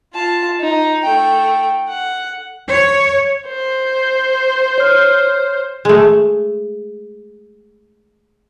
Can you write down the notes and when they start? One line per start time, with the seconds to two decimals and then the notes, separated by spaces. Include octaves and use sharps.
0.13 F4 A5
0.60 D#4
1.04 A3 G5
1.89 F#5
2.70 C#5
3.47 C5
4.78 C#5 F6
5.85 G#3 A3